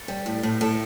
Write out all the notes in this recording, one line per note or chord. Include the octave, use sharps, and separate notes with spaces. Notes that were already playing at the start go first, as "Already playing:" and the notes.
Already playing: A4
G3
A2
A2
A2 A4